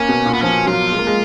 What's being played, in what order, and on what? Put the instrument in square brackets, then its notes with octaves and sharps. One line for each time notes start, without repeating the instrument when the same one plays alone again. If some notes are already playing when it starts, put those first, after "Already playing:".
Already playing: [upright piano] A#3 [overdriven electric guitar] C#4
[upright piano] B2
A#2
[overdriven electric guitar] B3
[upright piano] F3 [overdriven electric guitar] C#4
[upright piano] F#3 [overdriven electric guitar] F4
[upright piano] G#3
A#3
G#3